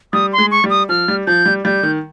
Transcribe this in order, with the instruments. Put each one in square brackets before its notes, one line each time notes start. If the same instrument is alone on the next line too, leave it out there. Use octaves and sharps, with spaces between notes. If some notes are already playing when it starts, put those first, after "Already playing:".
[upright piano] G3 [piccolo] D#6
[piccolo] C6
[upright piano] G#3
[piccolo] C#6
[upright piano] G3
[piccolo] D#6
[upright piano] F3 [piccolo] F6
[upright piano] G3
[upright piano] F3 [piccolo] G6
[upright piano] G3
[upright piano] G3 [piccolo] G6
[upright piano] D#3